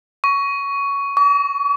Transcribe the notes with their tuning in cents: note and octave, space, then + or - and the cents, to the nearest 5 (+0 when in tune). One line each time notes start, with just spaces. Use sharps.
C#6 +15
C#6 +45